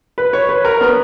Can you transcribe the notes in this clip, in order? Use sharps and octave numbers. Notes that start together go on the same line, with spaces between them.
B4
C#5
B4
A#4
B3